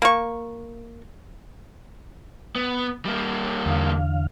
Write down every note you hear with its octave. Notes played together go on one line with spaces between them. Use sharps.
A#3 C#6
B3
G3 A#3
E2 D3 F5